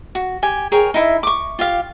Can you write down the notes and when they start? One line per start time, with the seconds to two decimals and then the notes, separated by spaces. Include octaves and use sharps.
0.15 F#4
0.43 G4 G#5
0.72 G#4 A#4 C#5 G5
0.94 D#4 E4 E5
1.23 C#6 D6
1.59 F4 G4 F5